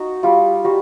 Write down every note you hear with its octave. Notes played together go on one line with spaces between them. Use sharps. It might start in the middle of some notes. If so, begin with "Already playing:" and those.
Already playing: D#4 F#4
G3 F4
G3 F#4